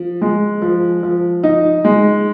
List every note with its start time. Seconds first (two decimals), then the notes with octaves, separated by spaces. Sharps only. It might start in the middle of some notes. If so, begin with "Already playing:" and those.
Already playing: F3
0.22 G#3
0.62 F3
1.03 F3
1.43 D#4
1.85 G#3